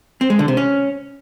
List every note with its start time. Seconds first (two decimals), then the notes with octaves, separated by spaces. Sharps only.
0.21 C4
0.30 G#3
0.39 D3
0.48 C3
0.57 C#4